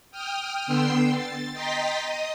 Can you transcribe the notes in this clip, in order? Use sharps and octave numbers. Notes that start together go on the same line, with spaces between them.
G5 D#6 F6
D3 B3 G5 C6 E6 C7
A6
D#5 G5 A#5 C6 A6 B6
D#5 D#6